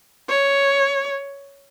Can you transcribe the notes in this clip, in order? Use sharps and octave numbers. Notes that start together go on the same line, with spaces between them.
C#5